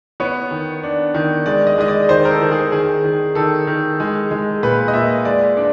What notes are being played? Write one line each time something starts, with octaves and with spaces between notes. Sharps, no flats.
B3 C#5
D#3
D4
D#3
G#3 D5
D#5
G#3 D#5
D5
D#3 C5
A#4
A4
D#3
G#4
D#3 G#4
D#3
D#3 A4
D#3
G#3
G#3
A#2 B4
D#5
A#2 E5
G#3 D5
D4